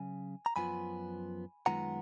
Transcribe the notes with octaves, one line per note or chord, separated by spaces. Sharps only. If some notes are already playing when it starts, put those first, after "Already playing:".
Already playing: C#3 F#3 G#5
A#5
F#2 F3 B3 F4 G#5 B5
F#2 D#3 G#3 B3 F4 F#5 A#5